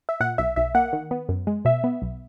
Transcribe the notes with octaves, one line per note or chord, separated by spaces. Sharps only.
E5
A#2 F#5
B1 E5
B1 E5
A#3 F#5
D#3
B3
F#2
G#3
B2 E5
B3
B1